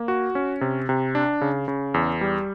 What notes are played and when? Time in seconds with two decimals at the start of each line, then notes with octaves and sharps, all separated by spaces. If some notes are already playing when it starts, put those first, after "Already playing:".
Already playing: A#3
0.08 F#4
0.35 C#4
0.61 C3
0.89 C3
1.15 D4
1.41 C#3
1.68 C#3
1.94 E2
2.21 G3